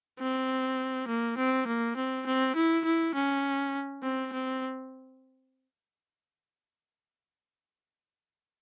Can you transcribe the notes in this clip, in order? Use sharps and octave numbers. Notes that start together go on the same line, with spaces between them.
C4
A#3
C4
A#3
C4
C4
E4
E4
C#4
C4
C4